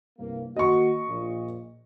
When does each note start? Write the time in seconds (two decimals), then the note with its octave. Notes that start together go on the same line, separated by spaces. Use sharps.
0.19 C2 G2 A#3
0.57 D#3 A#3 F#4 D#5 C#6
1.08 A#1 A#2